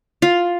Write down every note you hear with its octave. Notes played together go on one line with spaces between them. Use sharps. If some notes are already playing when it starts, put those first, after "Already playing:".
F4